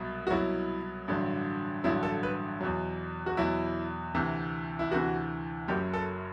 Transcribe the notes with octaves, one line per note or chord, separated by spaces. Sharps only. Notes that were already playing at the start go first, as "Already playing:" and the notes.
Already playing: C2 B2 F#3
F#4
C2 B2 F#3 E4
A1 G2 D3 F#3
A1 G2 D3 F#3 E4
A4
B4
E2 B2 F#3
F#4
E2 B2 F#3 E4
D2 C3 E3
E4
D2 C3 E3 F#4
F#1 F#2 F#3 G4
A4